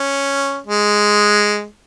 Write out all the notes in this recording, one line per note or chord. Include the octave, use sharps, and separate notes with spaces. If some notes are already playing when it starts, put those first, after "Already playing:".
Already playing: C#4
G#3